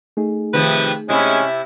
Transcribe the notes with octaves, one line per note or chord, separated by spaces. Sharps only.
A3 D#4 G#4
C3 D#3 F3 B4
C3 G#3 C#4 E4